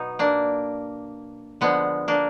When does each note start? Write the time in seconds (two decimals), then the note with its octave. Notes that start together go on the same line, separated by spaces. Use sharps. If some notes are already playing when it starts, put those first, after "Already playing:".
Already playing: B2 F#3 B3 D#4
0.19 A#3 D4
1.61 D3 F3 G#3 B3
2.08 A#3 D4